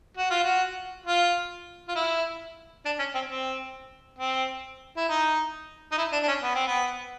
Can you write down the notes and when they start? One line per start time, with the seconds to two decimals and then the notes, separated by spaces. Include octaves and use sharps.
0.17 F#4
0.31 F4
0.44 F#4
1.06 F4
1.88 F4
1.95 E4
2.85 D4
2.99 C#4
3.15 C4
3.29 C4
4.18 C4
4.97 E4
5.09 D#4
5.92 D#4
5.98 E4
6.13 D4
6.23 D4
6.28 C#4
6.43 B3
6.55 C4
6.67 B3